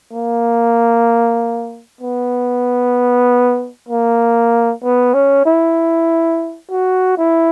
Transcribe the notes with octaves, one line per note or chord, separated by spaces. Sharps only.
A#3
B3
A#3
B3
C#4
E4
F#4
E4